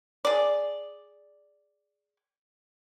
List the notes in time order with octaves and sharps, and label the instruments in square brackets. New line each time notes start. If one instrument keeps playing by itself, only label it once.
[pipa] G#4 D5